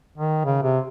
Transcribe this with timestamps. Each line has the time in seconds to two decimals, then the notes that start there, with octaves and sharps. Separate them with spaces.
0.18 D#3
0.45 C#3
0.63 C3